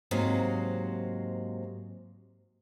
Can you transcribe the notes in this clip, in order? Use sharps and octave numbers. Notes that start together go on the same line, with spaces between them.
G#2 C3 F#3 A#3 C5